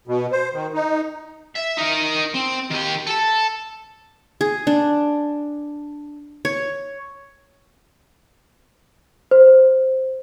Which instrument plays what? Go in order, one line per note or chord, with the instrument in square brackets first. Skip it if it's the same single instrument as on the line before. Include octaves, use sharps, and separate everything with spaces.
[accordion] B2
C5
D#3
D#4
[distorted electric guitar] E5
D#4 A#4
C4
D#3 G4
A4 A5
[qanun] G#4
D4
C#5
[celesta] C5